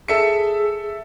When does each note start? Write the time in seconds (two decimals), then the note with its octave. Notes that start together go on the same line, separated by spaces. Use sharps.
0.08 G#4 A4 E5 C#7